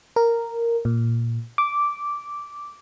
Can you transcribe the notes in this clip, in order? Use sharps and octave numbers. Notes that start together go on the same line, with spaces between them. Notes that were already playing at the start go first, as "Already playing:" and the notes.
A#4
A#2
D6